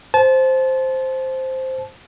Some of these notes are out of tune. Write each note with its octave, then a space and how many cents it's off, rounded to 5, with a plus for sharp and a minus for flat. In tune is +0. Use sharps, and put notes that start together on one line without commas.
C5 +0 A5 -30